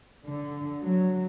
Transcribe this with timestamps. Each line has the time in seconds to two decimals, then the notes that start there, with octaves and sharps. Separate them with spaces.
0.23 D3
0.80 F#3